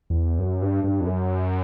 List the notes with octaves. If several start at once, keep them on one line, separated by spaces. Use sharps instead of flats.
E2
F#2
G2
G2
F2
F#2